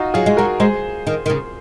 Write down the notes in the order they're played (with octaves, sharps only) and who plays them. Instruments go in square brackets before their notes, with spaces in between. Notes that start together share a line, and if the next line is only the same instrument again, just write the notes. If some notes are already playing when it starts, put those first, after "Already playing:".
Already playing: [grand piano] D#4 F4 F#4
[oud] F#3 [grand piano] F4 G#4
[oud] G#3
[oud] F#3 [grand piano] F#4 A#4
[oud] G#3 [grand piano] G#4 C5
[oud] D#3
D#3
C#3